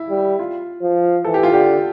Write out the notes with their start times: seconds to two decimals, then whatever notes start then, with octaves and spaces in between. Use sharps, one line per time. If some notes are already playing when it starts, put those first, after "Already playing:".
Already playing: E4
0.10 G3
0.39 F4
0.81 F3
1.25 E3 A4
1.34 G4
1.43 F4
1.52 D3 G4